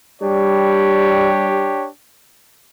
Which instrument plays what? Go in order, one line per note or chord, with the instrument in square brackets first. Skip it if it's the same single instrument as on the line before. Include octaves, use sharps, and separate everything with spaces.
[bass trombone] G3 [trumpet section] D4 G4 C#5